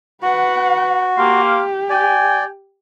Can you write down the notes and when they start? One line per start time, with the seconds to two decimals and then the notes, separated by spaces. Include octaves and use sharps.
0.22 F#4 B4 F#5
1.18 A#3 G4 F5 C6
1.90 D5 G5 G#5